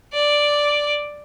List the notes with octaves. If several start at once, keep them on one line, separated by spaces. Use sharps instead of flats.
D5